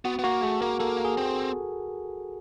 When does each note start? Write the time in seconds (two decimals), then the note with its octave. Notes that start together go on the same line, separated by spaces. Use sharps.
0.05 B3 F#4
0.19 B3
0.24 A#3 F#4
0.42 A3 G#4
0.61 A#3 A#4
0.79 A#3 A4
1.05 G#4
1.17 C4